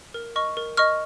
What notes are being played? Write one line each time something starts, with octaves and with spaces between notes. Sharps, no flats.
A#4
D#5 C#6 F6
A#4
D#5 C#6 F6